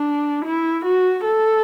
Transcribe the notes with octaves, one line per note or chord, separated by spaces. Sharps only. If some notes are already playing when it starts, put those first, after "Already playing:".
Already playing: D4
E4
F#4
A4